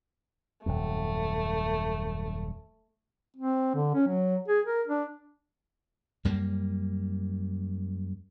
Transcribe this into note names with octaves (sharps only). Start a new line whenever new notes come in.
D#1 F#2 A3
C4
D3
C#4
F#3
G#4
A#4
D4
F#2 G3 A#3